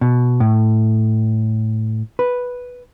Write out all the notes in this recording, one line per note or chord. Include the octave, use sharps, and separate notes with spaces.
B2
A2
B4